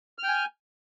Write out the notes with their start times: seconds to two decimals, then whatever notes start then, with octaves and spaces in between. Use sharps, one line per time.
0.19 F6
0.23 G5
0.28 G#5